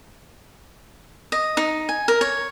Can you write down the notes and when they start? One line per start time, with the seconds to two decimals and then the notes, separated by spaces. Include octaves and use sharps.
1.32 D#5
1.57 D#4
1.89 G#5
2.08 A#4
2.21 C#5